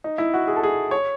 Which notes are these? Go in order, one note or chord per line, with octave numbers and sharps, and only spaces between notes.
D#4
E4
F#4
G#4
A4
G#4
C#5